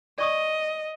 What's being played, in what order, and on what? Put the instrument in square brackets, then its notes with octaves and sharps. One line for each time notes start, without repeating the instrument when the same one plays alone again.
[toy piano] D5 C#6 D#6 [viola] D#5